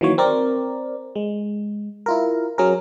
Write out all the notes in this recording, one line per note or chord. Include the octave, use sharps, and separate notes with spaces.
D#3 E3 F#3 A#3 C#5
C4 A#4 D5
G#3
E4 F4 A#4
F#3 C#4 G#4 A#4